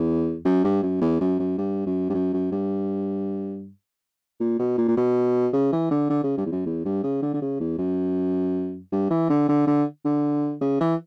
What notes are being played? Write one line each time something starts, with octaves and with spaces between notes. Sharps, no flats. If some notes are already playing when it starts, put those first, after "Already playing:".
Already playing: E2
F#2
G2
F#2
E2
F#2
F#2
G2
F#2
G2
F#2
F#2
G2
A#2
B2
A#2
A#2
B2
C#3
E3
D3
D3
C#3
G2
E2
F#2
E2
G2
C#3
D3
D3
C#3
E2
F#2
G2
E3
D3
D3
D3
D3
C#3
E3